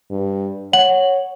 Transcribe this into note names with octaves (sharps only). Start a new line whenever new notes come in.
G2
C#5 F#5 F#7